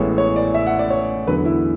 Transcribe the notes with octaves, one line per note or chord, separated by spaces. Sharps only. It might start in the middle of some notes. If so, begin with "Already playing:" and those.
Already playing: A1 A2 G#3 B3 C#5
C#5
D5
E5
F#5
D5
C#5
E2 D3 F#3 B4
E4